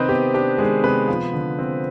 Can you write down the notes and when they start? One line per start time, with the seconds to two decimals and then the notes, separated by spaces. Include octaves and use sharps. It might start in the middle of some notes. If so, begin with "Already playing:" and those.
Already playing: C3 D#3 C4 D#4 B4 C5 D#5
0.09 B3 G4
0.34 D4 G4
0.58 D#3 G#3 G#4
0.84 C3 B3 B4
1.08 F3
1.33 D3
1.59 C4